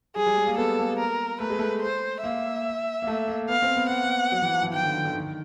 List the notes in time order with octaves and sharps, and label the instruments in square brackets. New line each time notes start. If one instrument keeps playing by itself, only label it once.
[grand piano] G3 [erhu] G#4
[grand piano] G3
G#3
A#3
[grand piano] B3 [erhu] A4
[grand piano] A#3
[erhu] A#4
[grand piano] A3 [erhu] B4
[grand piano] G#3
A3
[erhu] C5
[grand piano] A#3 [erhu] E5
[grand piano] A#3
A3
A#3
[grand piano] B3 [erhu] F5
[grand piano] C4
B3
[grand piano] A#3 [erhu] F#5
[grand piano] A#3
F#3
E3
F3
E3
[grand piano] D#3 [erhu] G5
[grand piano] D3
D#3
D3
D#3
D#3